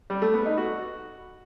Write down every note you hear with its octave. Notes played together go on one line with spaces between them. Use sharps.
G3
A3
B3
D#4
F#4